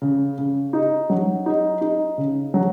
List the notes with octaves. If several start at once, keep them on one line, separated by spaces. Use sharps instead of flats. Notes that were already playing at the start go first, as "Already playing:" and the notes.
C#3
C#3
D#4
F#3
D#4
D#4
C#3
F#3